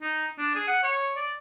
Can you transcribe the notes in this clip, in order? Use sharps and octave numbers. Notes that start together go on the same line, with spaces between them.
D#4
D4
G#4
F#5
C#5
D5